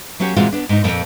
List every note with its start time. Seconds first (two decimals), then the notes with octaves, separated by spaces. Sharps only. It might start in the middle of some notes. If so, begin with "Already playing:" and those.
0.19 F#3 A#3 C#4 F#4 G4
0.37 A#2 E3 G#3 C4 F4 F#4
0.52 B3 D4
0.69 G#2 D#4
0.84 F2 A#2 A#3 C4